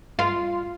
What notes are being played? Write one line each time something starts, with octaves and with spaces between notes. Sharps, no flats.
F4